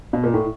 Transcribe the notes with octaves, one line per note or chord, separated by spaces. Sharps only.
B2
A#2
A2